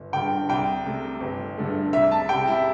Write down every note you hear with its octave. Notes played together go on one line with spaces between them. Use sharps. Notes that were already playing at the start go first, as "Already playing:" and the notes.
Already playing: G1
G2 D3 G5
C2 G5
C3 A3
G1
G2 D3 A3
C2 E5
A5
C3 G3 G5
E4